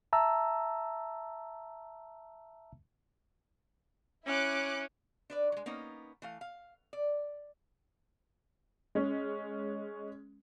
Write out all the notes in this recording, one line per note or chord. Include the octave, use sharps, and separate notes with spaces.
E5 A5 A#5 E6
C#4 E4 D6 F#6
D4 B4 D5
F#3 G#3
A#3 B3 C#4 D#4
E3 A3 F5
F5
D5
G#3 C#4